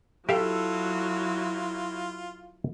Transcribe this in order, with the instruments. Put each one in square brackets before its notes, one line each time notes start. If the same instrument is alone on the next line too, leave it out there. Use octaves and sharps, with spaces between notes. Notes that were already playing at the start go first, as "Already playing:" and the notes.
[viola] F#3 E4 [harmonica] F4 [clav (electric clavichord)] G4 E5 F5 [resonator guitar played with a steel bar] A4